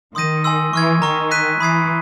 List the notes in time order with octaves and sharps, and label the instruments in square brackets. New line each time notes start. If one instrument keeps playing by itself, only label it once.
[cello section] D#3 [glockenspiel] C6 D#6 G6 A#6 D#7
[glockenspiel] G#5 C6 E6
[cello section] E3 [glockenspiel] C#6 F6 G#6
[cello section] D#3 [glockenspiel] A#5 C#6 F6
[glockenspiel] C#6 F#6 B6 D#7
[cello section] E3 [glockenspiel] B5 D#6 G#6 C7